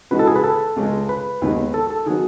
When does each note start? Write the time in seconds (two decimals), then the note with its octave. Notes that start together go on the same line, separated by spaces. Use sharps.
0.11 C#3 E3 G#3 D#4 F#4 B4
0.19 A4
0.27 G#4
0.36 B4
0.44 A4
0.76 C#2 C#3 G#3
1.09 B4
1.42 D#2 D#3 G#3 B3 D#4
1.74 A4
1.90 A4
2.06 D#3 F#3 B3 F#4 G#4